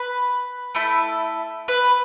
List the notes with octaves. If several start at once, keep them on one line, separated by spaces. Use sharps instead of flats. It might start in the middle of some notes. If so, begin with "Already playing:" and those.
Already playing: B4
A3 E4 A4
B4